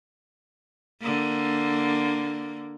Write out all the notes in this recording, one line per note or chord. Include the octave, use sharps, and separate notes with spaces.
D3 A#3